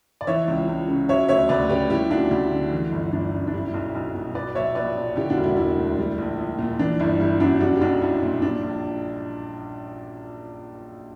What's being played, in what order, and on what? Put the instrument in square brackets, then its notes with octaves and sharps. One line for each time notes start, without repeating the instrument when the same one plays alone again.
[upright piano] D5
E3 C#5 E5
C#2
C#2
C#3
F#3 C#5 E5
D2 C#5 E5
D2 B4 D5
C#3 G4 B4
G3 E4 G4
D2 D4 F#4
D2 E4
D3
E3
G1
G1 D4
F#2
D4
G3 E4
B1
B1
B2
F#3 B4 D5
A#1 C#5 E5
A#1 B4 D5
A#2
D3 E4 G4
D4 F#4
E1
E4
E1 E4
D2
G3
A#1
A#1
A#2
E3 D4
G1 E4
G3 E4
F#2 D4 F#4
G3 D4 F#4
G4
B1 D4 F#4
B1 E4
A#2
G3 D4
A#1